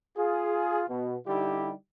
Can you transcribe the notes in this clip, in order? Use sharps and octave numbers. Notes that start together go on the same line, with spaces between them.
F4 G#4
B2
D3 G3 D#4 E4 G4